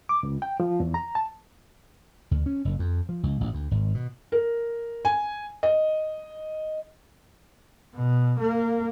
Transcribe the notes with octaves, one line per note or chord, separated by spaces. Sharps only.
D6
C#2
G5
F3
E2
A#5
A5
D2
C#4
F#1
F2
F3
C#2
A1
D2
G#1
B2
A#4
G#5
D#5
B2
A#3